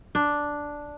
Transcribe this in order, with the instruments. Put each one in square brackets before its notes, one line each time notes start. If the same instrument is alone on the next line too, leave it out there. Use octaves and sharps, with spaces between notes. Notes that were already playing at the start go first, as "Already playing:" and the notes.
[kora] D4